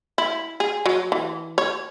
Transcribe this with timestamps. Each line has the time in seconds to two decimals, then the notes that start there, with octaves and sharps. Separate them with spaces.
0.18 E4
0.60 G#4
0.86 F#3
1.12 E3
1.58 C#5